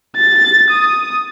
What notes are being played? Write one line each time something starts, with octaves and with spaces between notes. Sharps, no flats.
A6
D#6